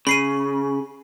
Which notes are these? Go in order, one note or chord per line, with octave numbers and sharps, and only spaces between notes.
C#3 B5 C7 D#7